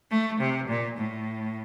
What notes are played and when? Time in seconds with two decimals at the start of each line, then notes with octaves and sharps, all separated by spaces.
0.11 A3
0.40 C3
0.68 A#2
0.97 A2